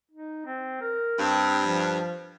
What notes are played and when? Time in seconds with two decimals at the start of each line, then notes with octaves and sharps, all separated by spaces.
0.11 D#4
0.46 C4
0.81 A#4
1.19 G2 C4
1.66 F3